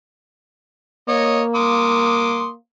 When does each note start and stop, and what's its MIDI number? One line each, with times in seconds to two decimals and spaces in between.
1.09 2.56 58
1.09 1.41 73
1.09 1.41 75
1.55 2.48 84
1.55 2.48 86
1.55 2.48 87